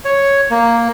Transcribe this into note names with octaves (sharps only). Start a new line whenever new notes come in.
C#5
A#3